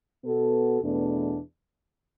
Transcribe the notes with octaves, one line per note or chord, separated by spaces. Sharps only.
B2 B3 F#4 A4
E2 B2 A3 D4